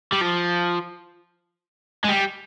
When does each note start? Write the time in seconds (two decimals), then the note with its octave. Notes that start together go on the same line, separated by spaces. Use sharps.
0.12 G3
0.21 F3
2.05 G#3
2.09 G3